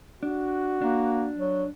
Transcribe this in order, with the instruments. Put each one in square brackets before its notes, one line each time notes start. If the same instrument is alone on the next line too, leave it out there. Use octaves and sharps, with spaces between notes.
[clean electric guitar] D4 [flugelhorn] F#4
[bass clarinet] A#3 [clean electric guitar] D4
[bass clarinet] F#3